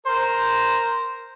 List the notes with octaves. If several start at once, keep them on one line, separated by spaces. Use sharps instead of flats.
A#4 C5